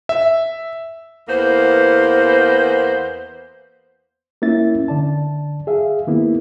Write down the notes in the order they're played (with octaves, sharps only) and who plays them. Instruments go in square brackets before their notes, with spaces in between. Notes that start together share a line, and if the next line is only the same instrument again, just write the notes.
[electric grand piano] E5
[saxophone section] E2 A#3 B3 C5
[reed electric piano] A#3 C#4 E4 E5 A6
D3 D5 A5
G#4 E5 F5
D#3 A#3 B3 E4